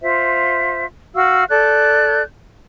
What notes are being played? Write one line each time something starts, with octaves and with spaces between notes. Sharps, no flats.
F4 C5 E5
F#4 F5 E6
A4 D5 F#6 G6